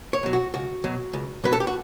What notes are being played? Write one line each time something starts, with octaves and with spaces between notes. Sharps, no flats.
C#5
B2 F#3
F#4
C#2 F#4
B2 F#3
C#2
B2 F#3 B4
A4
G4
F#4